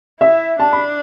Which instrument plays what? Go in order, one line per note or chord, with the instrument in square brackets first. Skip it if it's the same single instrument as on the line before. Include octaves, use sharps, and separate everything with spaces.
[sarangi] E4 [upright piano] E5
[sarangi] D4 [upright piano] A5
[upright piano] B5